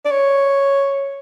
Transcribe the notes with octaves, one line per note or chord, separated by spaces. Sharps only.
D5
C#5